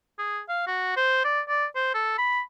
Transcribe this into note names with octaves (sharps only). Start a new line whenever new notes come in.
G#4
F5
F#4
C5
D5
D5
C5
A4
B5